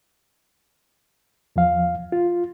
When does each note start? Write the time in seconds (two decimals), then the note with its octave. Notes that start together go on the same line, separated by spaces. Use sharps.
1.56 E2 F3 F5
2.12 F4